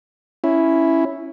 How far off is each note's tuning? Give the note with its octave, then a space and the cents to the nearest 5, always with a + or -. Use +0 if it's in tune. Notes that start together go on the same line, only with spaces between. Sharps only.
C#4 +0 E4 +0